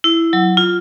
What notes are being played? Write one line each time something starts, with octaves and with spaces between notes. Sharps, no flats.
E4
F#3
F4